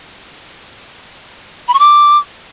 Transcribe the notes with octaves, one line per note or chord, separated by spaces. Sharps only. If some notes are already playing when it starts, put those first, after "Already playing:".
B5
C#6
D6